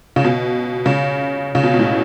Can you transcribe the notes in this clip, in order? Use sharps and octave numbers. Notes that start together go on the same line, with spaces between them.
C#3
B2
C#3
C#3
B2
B2
A2